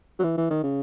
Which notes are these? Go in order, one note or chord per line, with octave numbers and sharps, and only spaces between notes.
F#3
E3
E3
D#3
C#3